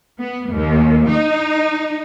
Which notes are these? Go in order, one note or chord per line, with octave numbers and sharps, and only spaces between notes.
B3
D#2
D#4